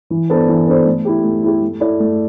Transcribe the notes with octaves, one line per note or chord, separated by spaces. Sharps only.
E3
B3 D4 A4 C5
E3
B3 D4 A4 C5
A3
E4 G4
A3
E4 G4
A3
E4 A4 D5
A3